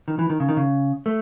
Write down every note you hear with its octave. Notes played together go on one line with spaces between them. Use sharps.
D#3
E3
D#3
C#3
D#3
C#3
A3